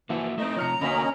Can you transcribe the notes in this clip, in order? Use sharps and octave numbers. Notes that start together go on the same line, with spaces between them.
E3 F3 A#3 E4 F#4
A3 C4 D#4 D#5
C3 F3 C#5 A#5 F6 C#7
D3 A#3 C#4 F#4 D#5 B5 A#6 B6